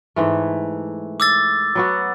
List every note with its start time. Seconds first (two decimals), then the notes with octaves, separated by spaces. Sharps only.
0.16 G#2 E3 A3
1.20 D6 E6 A6
1.75 F#3 B3 F#4